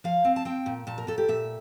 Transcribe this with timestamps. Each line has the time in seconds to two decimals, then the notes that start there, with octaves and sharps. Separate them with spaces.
0.04 F3 F5
0.25 C4
0.36 A5
0.45 C4 G5
0.66 A#2
0.87 A#2 A5
0.98 A#4
1.07 A#2 A4
1.18 G4
1.28 A#2 E5